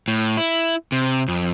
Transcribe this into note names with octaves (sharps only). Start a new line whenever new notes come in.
A2
E4
C3
F2